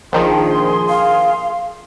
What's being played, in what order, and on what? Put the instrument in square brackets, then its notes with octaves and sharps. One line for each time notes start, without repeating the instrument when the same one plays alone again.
[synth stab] A#1 D#3 F3 [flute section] G#4 C6
[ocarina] F5